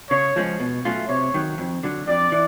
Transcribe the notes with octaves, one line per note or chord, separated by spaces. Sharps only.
C#3 C#5
F3 G#3 C#4
B2
F#3 A3 C#4 F4
C3 C#5
D#3 F#3
F2
D3 F#3
F2 D5
E3